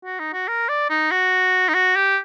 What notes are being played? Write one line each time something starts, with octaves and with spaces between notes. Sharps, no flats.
F#4
D#4
F#4
A#4
D5
D#4
F#4
D#4
F#4
G4